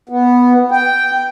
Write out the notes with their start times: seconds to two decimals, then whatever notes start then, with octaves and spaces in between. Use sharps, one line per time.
0.09 B3
0.71 G5